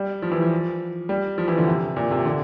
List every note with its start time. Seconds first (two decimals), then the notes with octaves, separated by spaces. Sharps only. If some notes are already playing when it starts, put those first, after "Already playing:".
Already playing: G3
0.22 F3
0.32 E3
0.42 F3
1.09 G3
1.38 F3
1.48 E3
1.58 D3
1.68 C3
1.97 A#2
2.11 C3
2.25 D3